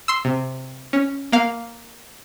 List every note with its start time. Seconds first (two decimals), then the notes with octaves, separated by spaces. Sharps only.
0.08 C6 E6
0.25 C3
0.93 C#4
1.32 A#3 F5